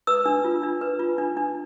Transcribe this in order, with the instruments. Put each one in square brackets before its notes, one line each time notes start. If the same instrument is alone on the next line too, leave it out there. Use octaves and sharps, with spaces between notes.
[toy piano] B4 E6
D4
F4
D4
B4
F4
D4
D4